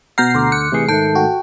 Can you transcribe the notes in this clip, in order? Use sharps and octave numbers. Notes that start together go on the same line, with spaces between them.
B2 F#5 A#5 F6 G6 C7
D2 D3 C6 D6
F#6 C#7
C3 E3 A3 G#4 C7
G#2 D#3 A3 A4 A5 G6
F#4 G5